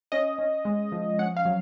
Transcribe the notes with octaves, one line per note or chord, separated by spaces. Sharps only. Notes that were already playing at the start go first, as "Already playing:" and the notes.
C#4 D#5
C#4
G#3
F3
C#4 F#5
F5
F#3